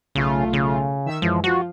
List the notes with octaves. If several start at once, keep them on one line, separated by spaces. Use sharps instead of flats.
B1 C#3 A3 F4
C#3
D#3 E5 E6
F#2 E3 F3 G#3
F3 F4 F#4